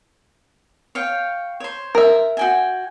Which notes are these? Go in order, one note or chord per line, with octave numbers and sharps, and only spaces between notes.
C#5 F5 G5
C5 C#5
A#4 E5
F#4 G5 G#5